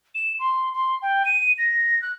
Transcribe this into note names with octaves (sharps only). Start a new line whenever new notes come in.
E7
C6
C6
G5
D#7
A#6
F#6